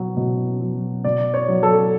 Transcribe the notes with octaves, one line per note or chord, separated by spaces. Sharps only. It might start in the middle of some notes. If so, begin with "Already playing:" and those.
Already playing: B2 F#3
B2
F#3
B2 D5
C#5
F#3
A4